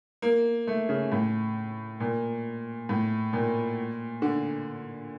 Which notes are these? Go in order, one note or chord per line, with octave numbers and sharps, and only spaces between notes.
A#3
A3
C#3
A2
A#2
A2
A#2
D3